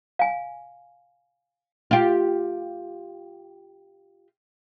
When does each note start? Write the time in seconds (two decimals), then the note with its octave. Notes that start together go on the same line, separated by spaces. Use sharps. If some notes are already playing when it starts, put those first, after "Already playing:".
0.19 F5 G#5
1.91 F4 G4